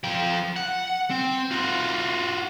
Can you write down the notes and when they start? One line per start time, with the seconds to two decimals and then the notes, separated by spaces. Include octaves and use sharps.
0.04 F3 G5
0.56 F#5
1.10 C4
1.51 F4 F#4